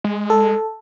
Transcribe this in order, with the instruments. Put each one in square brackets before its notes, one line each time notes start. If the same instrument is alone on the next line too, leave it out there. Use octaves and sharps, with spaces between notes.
[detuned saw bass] G#3
[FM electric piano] A4